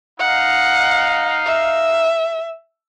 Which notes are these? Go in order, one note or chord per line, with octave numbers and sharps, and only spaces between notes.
D#4 F5 F#5
E5